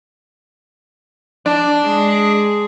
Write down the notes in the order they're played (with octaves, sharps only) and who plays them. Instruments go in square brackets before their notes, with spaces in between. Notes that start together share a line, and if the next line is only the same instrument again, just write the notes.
[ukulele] D4 [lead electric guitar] D5 A5
[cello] G#3 G#4